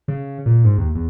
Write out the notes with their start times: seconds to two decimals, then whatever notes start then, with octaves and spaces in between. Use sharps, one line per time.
0.08 C#3
0.46 A#2
0.64 G#2
0.78 D#2
0.95 E2